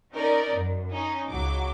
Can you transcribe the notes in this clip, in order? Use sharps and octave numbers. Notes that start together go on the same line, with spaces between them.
C#4 D#4 A#4 D5
F#2
C#4 D#4
C#2 F#3 D6